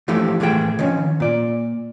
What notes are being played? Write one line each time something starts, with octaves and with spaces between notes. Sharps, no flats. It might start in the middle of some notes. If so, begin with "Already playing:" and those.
E3 F3 A3 E4 G4
A2 E3 A3 G#4 G5
D#3 F3 C#4
A#2 D5